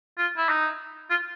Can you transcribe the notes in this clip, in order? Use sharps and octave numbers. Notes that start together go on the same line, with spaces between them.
F4
E4
D#4
F4